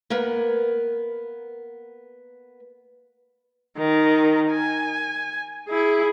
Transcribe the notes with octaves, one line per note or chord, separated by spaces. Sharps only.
A#3 B3 A#4 B4
D#3 A#4
G#5
E4 G#4